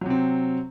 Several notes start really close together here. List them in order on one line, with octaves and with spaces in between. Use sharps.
F#3 C3 C4